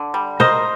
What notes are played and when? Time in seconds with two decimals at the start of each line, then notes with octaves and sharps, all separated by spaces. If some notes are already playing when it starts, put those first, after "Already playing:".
Already playing: D3
0.14 G3
0.40 A#4 C5 D#5